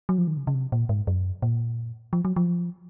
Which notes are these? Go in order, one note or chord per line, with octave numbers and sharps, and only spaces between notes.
F#3
F3
D#3
C#3
C#3
C3
A#2
G#2
F#2
A#2
F3
F#3
F3